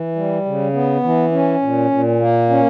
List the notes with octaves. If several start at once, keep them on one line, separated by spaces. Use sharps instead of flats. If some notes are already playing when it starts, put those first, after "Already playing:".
Already playing: E3
G3
C#3
B3
E3
C#4
A#2
A#2
A#3
C#4